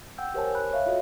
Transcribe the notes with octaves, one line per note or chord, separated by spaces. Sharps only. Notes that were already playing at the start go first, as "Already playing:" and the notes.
F#5 G5 E6 G6
G4 A#4 C5 C#5 G#5 A5
C#5 B5 F#6
C#5 E5 F5
F4 F#4 A4 C#5 D#5